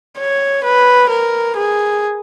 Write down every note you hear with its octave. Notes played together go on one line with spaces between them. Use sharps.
C#5
B4
A#4
G#4